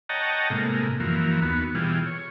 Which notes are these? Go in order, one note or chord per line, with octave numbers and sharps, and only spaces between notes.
C#5 D#5 F#5 G5 A5 A#5
A2 C3 G#3 A#3
F#2 E3 F3 A#3
D#2 B3 F#4
B2 E3 G3 F4 G#4
C#5